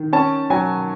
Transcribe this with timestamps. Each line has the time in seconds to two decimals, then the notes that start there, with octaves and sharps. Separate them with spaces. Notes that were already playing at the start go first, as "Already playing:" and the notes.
Already playing: D#3
0.13 C#4 A5
0.50 F#3 G#5